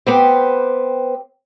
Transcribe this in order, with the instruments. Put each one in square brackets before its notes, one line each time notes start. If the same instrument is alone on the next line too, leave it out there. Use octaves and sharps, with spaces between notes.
[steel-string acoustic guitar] B3 B4 C5 [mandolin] C4 G4